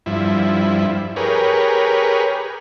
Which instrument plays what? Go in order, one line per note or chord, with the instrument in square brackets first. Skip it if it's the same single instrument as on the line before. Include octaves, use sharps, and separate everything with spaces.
[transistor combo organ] G2 F3 E4
G4 G#4 A#4 B4 C#5